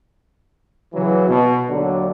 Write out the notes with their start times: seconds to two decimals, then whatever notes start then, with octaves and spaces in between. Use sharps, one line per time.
0.95 C#3 E3 F#3
1.29 B2
1.70 D#2 D3 F#3